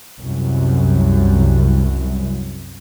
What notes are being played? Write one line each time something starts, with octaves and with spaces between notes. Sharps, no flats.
C2 F#2